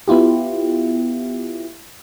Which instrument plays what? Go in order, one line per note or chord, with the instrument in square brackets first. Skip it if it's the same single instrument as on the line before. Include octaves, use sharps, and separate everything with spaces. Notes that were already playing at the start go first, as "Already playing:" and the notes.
[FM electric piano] B3 E4 F4 G4